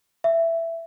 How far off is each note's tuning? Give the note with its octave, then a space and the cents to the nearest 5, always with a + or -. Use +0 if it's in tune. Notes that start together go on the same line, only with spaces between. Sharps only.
E5 +10